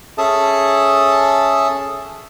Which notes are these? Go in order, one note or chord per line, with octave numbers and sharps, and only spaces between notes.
C#4 G#4 A4 E5 A5 D#6